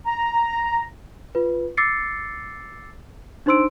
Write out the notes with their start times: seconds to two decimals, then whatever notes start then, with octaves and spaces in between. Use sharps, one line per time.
0.05 A#5
1.35 F4 B4
1.77 D6 E6 A6 C7 C#7
3.46 D4 D#4 C5 C6 E6 D7